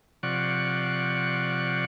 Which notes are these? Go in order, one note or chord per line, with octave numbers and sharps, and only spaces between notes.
C3 F3 D5 F#5 C#6